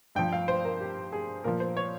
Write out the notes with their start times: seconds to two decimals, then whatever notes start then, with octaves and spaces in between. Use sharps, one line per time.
0.15 G2 F3 G5
0.32 F5
0.48 C5
0.65 A#4
0.81 G4
1.13 G#4
1.44 A#2 F3 A#4
1.60 C5
1.77 C#5